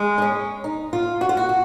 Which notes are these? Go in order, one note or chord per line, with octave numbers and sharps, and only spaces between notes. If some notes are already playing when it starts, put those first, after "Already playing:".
Already playing: G#3
D#4
C#4
D#4
F4
F#4
F4
F#4
F#4